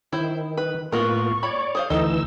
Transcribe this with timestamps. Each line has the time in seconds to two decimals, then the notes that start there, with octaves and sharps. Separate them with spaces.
0.13 D#3 E4 C5
0.57 B4
0.92 A2 A#3 B3 F4 F#4 A#4 C#6
1.43 C#5 D5 B5
1.75 G#4 C5 F5
1.90 D2 E3 D#4 A4 D#5 E6